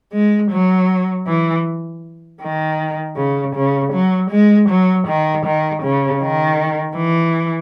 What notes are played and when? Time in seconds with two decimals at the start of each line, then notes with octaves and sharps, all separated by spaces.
0.12 G#3
0.50 F#3
1.27 E3
2.41 D#3
3.17 C#3
3.55 C#3
3.93 F#3
4.30 G#3
4.69 F#3
5.07 D#3
5.45 D#3
5.82 C#3
6.21 D#3
6.96 E3